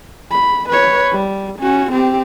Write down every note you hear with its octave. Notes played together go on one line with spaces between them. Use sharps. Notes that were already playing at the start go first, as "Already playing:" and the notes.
B5
B4 C#5
G3
C#4 F#4
C4 G4